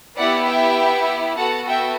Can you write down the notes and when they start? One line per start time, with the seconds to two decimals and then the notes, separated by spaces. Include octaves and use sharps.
0.17 B3 E4 G4 D5 F#5
0.47 E5 G5
1.37 B3 F#4 A4 F#5 A5
1.67 E5 G5